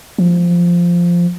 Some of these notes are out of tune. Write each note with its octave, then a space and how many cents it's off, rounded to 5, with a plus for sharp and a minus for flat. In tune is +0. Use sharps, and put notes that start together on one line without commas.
F3 -5